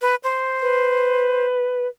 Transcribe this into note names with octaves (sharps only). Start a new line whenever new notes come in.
B4
C5
B4